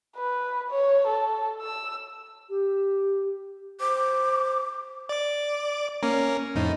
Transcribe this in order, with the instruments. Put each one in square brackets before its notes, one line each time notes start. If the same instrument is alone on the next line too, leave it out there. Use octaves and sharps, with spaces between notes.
[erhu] B4
C#5
A4
E6
[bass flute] G4
[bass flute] C5 [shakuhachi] D6
[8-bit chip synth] D5 D6
A#3 C#4 A#4
F2 A2 D#4